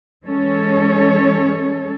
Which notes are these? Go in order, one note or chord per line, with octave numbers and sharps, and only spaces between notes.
E3 G#3 C#4 A4 C#5